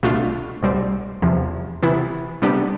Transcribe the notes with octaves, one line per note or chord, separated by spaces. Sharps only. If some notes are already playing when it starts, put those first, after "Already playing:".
C2 B2 A3 D4 F4
C2 B2 G3 C4
E2 C3 F3
C3 E3 B3 E4
C3 G3 B3 D4 G4